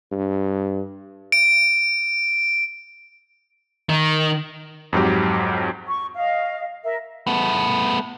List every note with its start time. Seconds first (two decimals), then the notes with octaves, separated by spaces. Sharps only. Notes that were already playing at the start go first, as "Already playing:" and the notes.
0.11 G2
1.32 D7
3.89 D#3
4.93 F2 G#2 F#3 G4
5.88 C#6
6.15 D#5 F5
6.84 A#4 E5
7.27 A3 B3